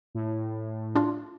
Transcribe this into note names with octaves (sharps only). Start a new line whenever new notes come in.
A2
D4 F4